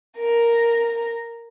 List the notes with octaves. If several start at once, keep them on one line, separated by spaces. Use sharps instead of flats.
A#4